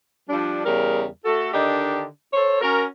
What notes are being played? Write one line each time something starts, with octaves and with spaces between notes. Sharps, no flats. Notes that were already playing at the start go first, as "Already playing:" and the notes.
F3 G3 D4
E2 C#3 G3 A#4
A3 F#4 A4
D3 D#3 D4 D#4 G4
A4 C5 C#5
C#4 F#4 A#4